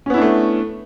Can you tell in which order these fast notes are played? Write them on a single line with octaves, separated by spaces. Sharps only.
C#4 B3 E4 D4 A3